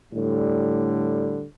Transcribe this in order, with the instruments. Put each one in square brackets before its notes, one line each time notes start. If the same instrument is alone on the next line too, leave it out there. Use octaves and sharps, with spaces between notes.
[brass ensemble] A2 D3 G3